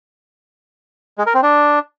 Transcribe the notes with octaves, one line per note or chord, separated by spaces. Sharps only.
G#3
A#4
C4
D4